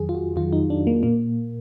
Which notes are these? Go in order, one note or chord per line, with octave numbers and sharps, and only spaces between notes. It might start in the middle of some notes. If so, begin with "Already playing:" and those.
Already playing: F2 D#3 F#3 G#4
F4
F#4
F2 D#3 F#3 F4
D#4
D4
A#3
A#2 A#3